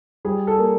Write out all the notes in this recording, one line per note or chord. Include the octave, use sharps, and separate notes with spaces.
G3 G#4
A4
A#3